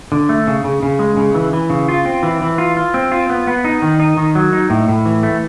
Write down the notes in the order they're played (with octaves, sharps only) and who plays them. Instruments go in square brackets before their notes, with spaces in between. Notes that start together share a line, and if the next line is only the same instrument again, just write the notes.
[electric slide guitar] D3
A3
C#3
C#3
C#3
G#3
C#3
E3
E3
C#3
F4
C4
E3
E3
F4
F4
C4
F4
B3
B3
D#4
D#3
D#4
D#3
F#3
D#4
A2
A2
E3
A3